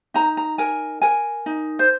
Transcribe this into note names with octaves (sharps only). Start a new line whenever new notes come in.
D#4 A#5
A#5
A#4 G#5
A#4 G#5
D#4
C5